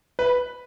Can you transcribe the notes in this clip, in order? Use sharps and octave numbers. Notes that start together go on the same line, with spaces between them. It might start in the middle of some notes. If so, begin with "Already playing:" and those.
B4